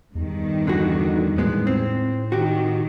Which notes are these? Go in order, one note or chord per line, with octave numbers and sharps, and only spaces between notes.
E2 G2 D#3
D3 E3 F#4
A2 G#3 B3
C4
D#3 F#4 G4